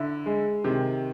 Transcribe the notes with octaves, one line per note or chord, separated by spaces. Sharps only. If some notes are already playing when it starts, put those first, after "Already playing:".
Already playing: D3 E4
G#3
C3 D#3